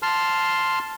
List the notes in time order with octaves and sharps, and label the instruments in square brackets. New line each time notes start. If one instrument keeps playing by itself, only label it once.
[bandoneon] A5 C6 F6